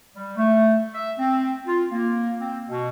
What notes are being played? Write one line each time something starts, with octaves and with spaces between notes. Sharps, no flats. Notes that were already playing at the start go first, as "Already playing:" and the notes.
G3
A3
E5
C4
F4
A#3
C4
B2